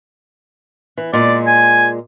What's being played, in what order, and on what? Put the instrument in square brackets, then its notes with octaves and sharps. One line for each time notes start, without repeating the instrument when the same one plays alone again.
[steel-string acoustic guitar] E3
[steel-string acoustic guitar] A#2 G#3 [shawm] D5
[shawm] G#5